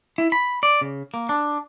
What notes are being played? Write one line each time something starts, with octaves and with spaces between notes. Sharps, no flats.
E4
B5
D5
C#3
A#3
D4